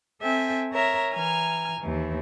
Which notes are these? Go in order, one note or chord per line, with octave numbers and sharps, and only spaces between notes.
C4 A4 E5 G5 G#5
A#4 C#5 E5 A#5
E3 G#5 A#5 F6
D#2 E3